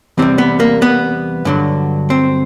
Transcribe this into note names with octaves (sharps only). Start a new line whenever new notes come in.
E2 C3 E3 G3 C4
B3
A#3
B3
G2 D3 F#3
C4